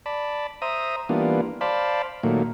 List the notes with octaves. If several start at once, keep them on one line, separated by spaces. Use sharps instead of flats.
D5 A5 B5
C5 E5 A#5 D#6
E3 G3 A#3 B3 D4 F4
C5 D5 F5 A5 B5
A#2 D#3 F#3 A3 A#3